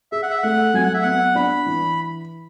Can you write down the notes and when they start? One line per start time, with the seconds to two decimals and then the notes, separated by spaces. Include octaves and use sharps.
0.12 G#4 E5
0.22 F#5
0.31 E5
0.43 A3 F#5
0.74 F#3 G#5
0.83 F#5
0.94 E5
1.03 B3 F#5
1.35 D4 B5
1.66 E3